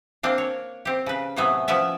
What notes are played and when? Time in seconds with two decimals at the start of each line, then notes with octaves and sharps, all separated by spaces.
0.23 A#3 C4 D4
0.38 C#5
0.85 C4 G4
1.06 C#3 B4
1.36 A2 C3 F#3 A3 B3 G#5
1.68 F3 B3 C#4 D5 E5